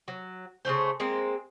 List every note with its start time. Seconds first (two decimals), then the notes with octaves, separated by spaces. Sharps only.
0.08 F#3
0.65 C#3 F#3 A3 C5
1.00 G#3 A#3 C4